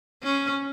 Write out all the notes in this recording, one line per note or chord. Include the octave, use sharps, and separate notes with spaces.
C#4